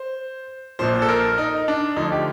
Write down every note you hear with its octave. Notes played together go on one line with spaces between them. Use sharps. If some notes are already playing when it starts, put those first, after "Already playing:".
Already playing: C5
A#1 A#2 F3 C5
A4
A#4
D#4
D4
D2 D3 F3 D#4
G4